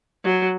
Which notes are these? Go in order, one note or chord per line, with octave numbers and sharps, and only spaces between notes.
F#3